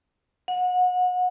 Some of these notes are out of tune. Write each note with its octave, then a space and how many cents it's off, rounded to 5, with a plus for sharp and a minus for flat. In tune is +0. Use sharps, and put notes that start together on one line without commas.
F#5 -30